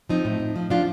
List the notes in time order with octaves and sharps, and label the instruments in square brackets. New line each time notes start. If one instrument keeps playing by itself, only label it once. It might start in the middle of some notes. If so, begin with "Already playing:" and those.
[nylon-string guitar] F3 C4 D#4
A2
A2
F3
F3 D4 F4